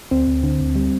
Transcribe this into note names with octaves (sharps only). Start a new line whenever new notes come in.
D2 C4
D2
D3
D2
G3